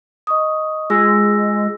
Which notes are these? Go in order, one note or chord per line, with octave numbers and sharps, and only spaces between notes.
D#5 C#6 D#6
G#3 F4 E6 A#6